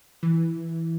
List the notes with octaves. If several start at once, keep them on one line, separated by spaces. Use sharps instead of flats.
E3